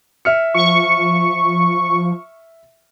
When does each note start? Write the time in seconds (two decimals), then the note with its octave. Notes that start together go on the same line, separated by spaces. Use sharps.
0.25 E5 F6 C#7
0.54 F3 C#6